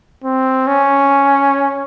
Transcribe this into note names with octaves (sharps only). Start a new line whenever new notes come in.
C4
C#4